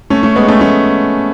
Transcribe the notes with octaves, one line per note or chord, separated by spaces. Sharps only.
A3 C#4
A3 C#4
G#3 B3
A3 C#4
A3 C#4